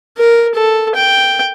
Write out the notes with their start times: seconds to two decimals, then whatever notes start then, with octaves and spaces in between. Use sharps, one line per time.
0.17 A#4
0.54 A4
0.95 G5